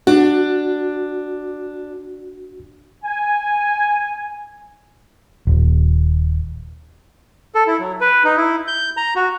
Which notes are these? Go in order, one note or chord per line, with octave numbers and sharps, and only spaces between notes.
D4 F#4
G#5
D#1
A4
E4
F#3
B4
D#4
E4
G6
A#5
F#4